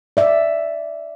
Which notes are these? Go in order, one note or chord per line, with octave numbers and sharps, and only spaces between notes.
D5 E5